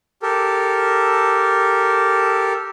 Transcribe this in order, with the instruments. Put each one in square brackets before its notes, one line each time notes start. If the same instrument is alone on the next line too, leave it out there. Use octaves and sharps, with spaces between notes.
[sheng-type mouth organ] G4 A4 A#4